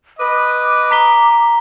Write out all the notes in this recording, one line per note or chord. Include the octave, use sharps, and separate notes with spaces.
B4 D#5 D6
A#5 B6 G7